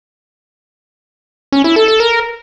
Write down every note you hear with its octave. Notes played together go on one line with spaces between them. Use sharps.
C#4
E4
A4
A4
A#4